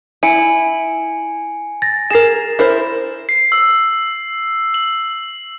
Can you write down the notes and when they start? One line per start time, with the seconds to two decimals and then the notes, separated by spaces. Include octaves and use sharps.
0.23 E4 G#5 C#7 D7
1.82 A6 A#6
2.10 G#4 A#4 C7 E7
2.59 E4 A#4 C5
3.29 C7
3.52 E6
4.74 F#7